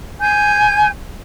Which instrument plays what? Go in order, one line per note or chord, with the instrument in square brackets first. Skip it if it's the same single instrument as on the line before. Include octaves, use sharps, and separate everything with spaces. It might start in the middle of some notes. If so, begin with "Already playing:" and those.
[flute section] G#5 G6